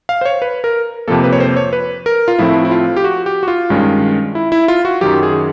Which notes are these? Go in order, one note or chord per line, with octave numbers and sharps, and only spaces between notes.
F5
C5
C#5
B4
A#4
F2 C3 F3 A#3 A4
B4
C#5
C5
C#5
B4
A#4
F4
A2 F3 A3 C4 E4
E4
F4
G4
F#4
G4
F#4
F4
G2 D#3 G#3 C#4
E4
E4
F4
F#4
F#2 D#3 F#3 G4
G#4